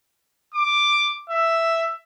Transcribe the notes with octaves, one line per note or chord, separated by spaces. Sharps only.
D6
E5